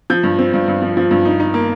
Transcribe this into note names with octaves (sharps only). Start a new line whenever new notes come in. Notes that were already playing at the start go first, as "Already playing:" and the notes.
F3 G6
G2
C4
G2
G2
F3
F3
G2
D#4
D#4
A#3